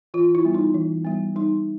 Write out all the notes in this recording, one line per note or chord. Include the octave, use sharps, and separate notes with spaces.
E3 F4
E4
G3 B3
D#4
E3
G3 B3
G3 D#4